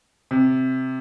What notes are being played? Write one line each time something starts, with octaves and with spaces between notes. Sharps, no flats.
C3